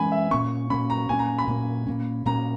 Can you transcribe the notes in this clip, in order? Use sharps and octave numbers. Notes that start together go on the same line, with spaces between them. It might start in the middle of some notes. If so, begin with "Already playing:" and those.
Already playing: E3 G#3 C#4 G#5 B5
E5
A#2 A#3 C#4 C#6
A#2 A#3 C#4 B5
A#5
A#2 A#3 C#4 G#5
A#5
B5
A#2 A#3 C#4
A#2 A#3 C#4
A#2 A#3 C#4 A#5